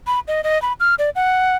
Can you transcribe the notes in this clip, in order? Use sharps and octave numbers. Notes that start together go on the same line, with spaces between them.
B5
D#5
D#5
B5
F6
D5
F#5